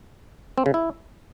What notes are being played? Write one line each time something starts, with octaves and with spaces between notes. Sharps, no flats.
C4
C#3
E4